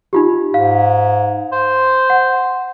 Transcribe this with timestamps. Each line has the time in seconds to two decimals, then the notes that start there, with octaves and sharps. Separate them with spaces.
0.13 D#4 F4 G4
0.54 G#2 F5
1.52 C5
2.10 F#5